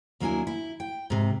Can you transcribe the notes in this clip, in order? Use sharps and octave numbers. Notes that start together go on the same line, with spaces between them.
D#2 F#3 A#3 D4 E4 G#5
E4
G5
G#2 C3